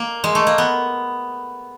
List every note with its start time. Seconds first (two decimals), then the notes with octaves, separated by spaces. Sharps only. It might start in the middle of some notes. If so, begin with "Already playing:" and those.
Already playing: A#3
0.24 G#3
0.35 A3
0.47 A#3
0.58 B3